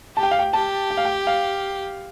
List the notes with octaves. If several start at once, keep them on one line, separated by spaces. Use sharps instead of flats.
G4 A5
G5
F5
G5
G4 A5
G5
F5
G5
F5